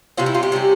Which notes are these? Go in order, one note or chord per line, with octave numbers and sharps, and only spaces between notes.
C3 G3 C#4 F4
E4
F4
G4
C3 G3 C#4